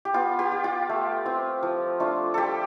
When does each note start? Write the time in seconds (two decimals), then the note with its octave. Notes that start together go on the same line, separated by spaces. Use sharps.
0.05 G4
0.14 B3 F4
0.39 G4
0.52 F4
0.64 F4
0.89 A3
1.26 C4 F4
1.63 F3
2.00 A3 D4 F4
2.34 G3 G4 A4